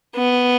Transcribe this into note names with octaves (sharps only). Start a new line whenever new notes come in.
B3